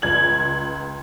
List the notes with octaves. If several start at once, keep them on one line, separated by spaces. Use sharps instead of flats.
C#2 G#6 F#7